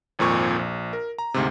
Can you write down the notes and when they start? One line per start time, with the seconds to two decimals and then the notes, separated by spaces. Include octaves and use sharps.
0.19 G#1 F2 A#2 C#6
0.59 A#1
0.93 A#4
1.18 A#5
1.34 D2 G#2 C3